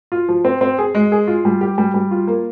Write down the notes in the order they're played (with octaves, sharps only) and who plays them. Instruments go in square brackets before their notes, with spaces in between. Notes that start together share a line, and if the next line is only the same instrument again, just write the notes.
[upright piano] F4
F3
C4
C4
G#4
G#3
G#4
F4
G3
G4
G3
G3
F4
A#3